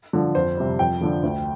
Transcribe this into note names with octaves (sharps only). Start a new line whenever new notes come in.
D3 F3
F2 C5
C3 G3
F2 G5
D3 F3
D2